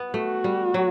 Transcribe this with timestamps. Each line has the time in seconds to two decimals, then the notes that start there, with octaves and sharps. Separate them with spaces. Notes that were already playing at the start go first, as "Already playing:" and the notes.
Already playing: B3
0.14 A3 F#4
0.44 G3
0.74 F#3